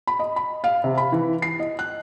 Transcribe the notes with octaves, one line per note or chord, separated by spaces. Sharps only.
B5
D#5
B5
F5
C3
B5
E3
C7
D#5
F#6